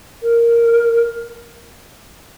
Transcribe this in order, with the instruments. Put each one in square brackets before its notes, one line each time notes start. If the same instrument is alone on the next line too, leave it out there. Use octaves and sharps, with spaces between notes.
[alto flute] A#4